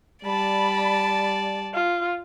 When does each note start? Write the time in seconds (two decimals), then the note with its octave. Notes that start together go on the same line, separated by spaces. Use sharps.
0.25 G3 D5 A5 B5
1.73 F4